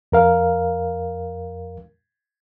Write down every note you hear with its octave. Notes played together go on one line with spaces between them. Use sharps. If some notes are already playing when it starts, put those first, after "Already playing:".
F2 A#4 F5